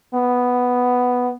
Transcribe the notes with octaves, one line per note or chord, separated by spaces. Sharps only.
B3